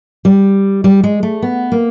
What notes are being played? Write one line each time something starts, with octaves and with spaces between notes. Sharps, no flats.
G3
G3
G#3
A3
B3
A#3